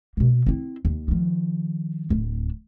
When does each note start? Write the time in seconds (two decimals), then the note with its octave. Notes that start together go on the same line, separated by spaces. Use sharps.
0.17 B2 A#3
0.46 C4 E4
0.85 D#2
1.08 D#3 F3
2.10 D1 D4